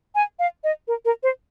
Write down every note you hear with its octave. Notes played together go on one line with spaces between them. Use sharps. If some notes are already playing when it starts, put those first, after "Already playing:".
G#5
F5
D#5
A#4
A#4
C5